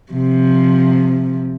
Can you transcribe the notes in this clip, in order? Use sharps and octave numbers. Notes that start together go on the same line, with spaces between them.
C3 F3